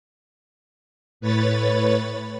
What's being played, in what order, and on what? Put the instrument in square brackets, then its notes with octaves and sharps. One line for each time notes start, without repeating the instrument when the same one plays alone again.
[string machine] A2 B4 C#5 B5 A6